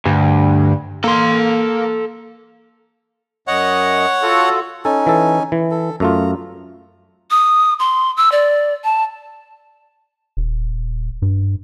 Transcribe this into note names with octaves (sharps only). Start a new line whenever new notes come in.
D2 G2
A#3 A4 C6
F#2 C#5 D#5 F#5
F4 F#4 A4
C#4 D#4 A4 G#5
E3 A4
E3
A4
F#2 A3 F4 A#5
D#6
C6
E6
D5
A5
D#1
G2